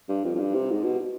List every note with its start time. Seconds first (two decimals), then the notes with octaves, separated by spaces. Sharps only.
0.09 G2
0.25 F2
0.35 F2
0.40 G2
0.55 C3
0.71 G#2
0.84 B2